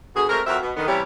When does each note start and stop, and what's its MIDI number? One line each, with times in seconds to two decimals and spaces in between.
0.16 0.26 47
0.16 0.26 50
0.16 0.26 66
0.16 0.26 68
0.29 0.42 56
0.29 0.42 57
0.29 0.42 60
0.29 0.42 66
0.29 0.42 70
0.46 0.58 41
0.46 0.58 54
0.46 0.58 66
0.46 0.58 70
0.46 0.58 72
0.46 0.58 76
0.63 0.72 47
0.77 0.87 50
0.77 0.87 51
0.77 0.87 59
0.88 1.02 48
0.88 1.02 52
0.88 1.02 55
0.88 1.02 61
0.88 1.02 64
0.88 1.02 67